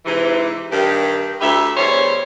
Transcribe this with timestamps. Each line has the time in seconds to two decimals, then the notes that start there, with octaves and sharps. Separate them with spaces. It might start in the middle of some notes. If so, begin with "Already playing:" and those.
0.06 G#2 C3 E3
0.72 G2 D#3 G4
1.41 D2 G4 B4 E5
1.77 E2 G3 C5 C#5